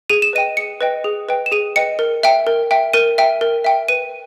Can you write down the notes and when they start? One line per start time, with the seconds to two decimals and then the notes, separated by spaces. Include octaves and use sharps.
0.10 G#4 D#7
0.22 E7
0.33 B4 D#5 G5 D#7
0.57 G#4 C#7
0.81 B4 D#5 G5
1.04 G#4
1.29 B4 D#5 G5
1.46 E7
1.52 G#4 D#7
1.76 B4 D#5 G5 C#7
1.99 A#4
2.23 E5 G5
2.47 A#4
2.71 E5 G5
2.93 A#4 D#7
3.18 E5 G5
3.41 A#4
3.64 E5 G5
3.88 B4 D#7